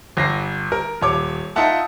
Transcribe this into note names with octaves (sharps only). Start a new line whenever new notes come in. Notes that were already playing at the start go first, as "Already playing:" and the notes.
G1 A#6 C7
A#4
D#1 C#5 D6
D#4 F4 E5 F#5 A5